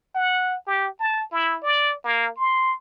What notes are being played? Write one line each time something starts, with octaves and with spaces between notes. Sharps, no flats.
F#5
G4
A5
E4
D5
A#3
C6